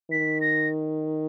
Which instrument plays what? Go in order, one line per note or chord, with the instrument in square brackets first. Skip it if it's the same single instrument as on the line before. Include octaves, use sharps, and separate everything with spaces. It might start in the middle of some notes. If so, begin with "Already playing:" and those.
[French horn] D#3 [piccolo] B6
[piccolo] A#6